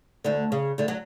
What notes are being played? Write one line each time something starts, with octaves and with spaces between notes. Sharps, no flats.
D2 D3
C#3
D2 D3
F#3